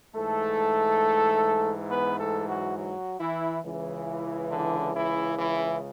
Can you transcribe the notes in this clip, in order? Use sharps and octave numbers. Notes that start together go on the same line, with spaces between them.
G#2 E3 A3 A4
B3 B4
A3 A4
F#3 F#4
F#3 F#4
E3 E4
C#2 C#3 E3
D3 D4
E3 E4
E3 E4